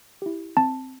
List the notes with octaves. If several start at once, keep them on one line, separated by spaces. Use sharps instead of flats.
E4 G4
C4 A5